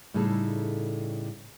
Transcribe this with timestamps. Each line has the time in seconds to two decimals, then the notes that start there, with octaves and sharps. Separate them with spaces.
0.14 A2 C#3 G3 D#4 G#4 A4